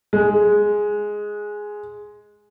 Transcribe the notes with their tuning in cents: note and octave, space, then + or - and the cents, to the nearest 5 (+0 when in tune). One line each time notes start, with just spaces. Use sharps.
G#3 +5